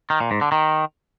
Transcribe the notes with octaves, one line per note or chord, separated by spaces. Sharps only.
D#3
A#2
G#2
D3
D#3